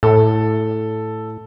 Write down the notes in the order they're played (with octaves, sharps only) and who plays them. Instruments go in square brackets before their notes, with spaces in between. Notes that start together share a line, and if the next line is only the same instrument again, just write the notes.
[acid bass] A2 [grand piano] A4